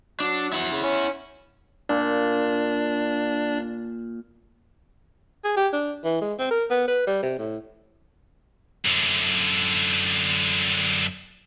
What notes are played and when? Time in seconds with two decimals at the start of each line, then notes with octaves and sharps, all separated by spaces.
0.20 F#3 D4
0.53 E4 F#5
0.71 C#3
0.83 C#4
1.89 A#2 D4
5.45 G#4
5.57 G4
5.73 D4
6.05 E3
6.21 G#3
6.39 C4
6.51 A#4
6.71 B3
6.88 B4
7.07 G3
7.22 C3
7.39 A2
8.85 F#2 D3